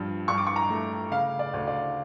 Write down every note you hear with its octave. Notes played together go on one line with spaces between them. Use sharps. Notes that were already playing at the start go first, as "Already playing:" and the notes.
Already playing: G2 F3
G2 C#6
D6
C#6
A#5
A3
C#3 F5
D5
D2
D5